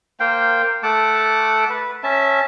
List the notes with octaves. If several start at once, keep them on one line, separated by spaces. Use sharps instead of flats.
A#3 C5 F5 G5
A3 F#5 A5 D6
B4
C#4 E5 A5